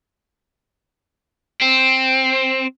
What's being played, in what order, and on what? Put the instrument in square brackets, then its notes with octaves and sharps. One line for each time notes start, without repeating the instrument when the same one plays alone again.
[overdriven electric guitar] C4